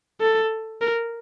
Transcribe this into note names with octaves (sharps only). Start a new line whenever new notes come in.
A4
A#4